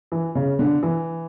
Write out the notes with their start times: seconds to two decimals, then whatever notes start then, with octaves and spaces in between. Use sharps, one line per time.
0.12 E3
0.35 C#3
0.59 D3
0.83 E3